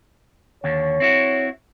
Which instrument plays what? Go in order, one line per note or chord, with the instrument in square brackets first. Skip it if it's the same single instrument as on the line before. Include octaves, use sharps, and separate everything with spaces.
[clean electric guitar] D#2 D3 [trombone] C#5
[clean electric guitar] C4 E4 F#4